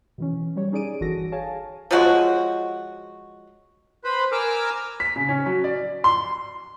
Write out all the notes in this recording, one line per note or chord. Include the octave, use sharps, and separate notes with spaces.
B2 E3 C#4
F#3 G3 G4 C#5
C#4 D#4 G#4 D5 D7 D#7
G1 E3 F#4 A4 A#6
G#4 C#5 F5 G#5 A5
F3 F#3 G#3 F#4
B4 C5 B5
A#4 G#5 A#5 D6 E6 F6
B6
C#3
C#4
F#3
D5
C6